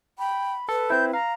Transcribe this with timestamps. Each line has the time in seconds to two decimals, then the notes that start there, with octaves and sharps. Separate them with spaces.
0.19 G5 B5
0.69 A4 B4
0.90 C4 E4 G6
1.13 F5 A#5